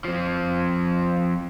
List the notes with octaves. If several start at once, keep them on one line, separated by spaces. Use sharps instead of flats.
F3 C4